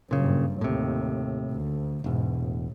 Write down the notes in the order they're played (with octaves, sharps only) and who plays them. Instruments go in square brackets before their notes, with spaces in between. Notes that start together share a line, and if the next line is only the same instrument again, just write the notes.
[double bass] F#1 G2 [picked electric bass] A#2 C#3
[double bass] D#2 [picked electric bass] A2 C3
[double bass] D2
[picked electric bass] E1 E2 [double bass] G#2 B2
[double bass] A1